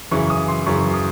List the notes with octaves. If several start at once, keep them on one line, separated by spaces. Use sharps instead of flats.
F#2 C#3 E3 C#6
D#6
C6
F#2 C#3 E3 C#6
D#6